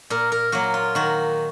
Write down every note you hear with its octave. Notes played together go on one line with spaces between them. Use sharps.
A#2 A#4
A#4
F#3 A#3 F#4
F4
D#3 F#4